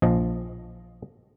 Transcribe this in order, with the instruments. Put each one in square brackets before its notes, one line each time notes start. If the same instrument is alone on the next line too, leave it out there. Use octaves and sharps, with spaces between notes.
[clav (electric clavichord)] A#1 F3 D#5